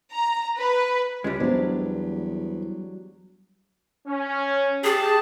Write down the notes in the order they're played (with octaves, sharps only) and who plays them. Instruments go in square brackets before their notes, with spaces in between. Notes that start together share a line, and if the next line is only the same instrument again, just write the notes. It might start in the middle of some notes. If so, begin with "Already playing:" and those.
[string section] A#5
B4
[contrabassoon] C#2 [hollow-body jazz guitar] G3 G#3
[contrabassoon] E2 [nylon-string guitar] F#3 D4 [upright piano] B3 C5
[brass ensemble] C#4
[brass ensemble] G4 A5 [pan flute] G#4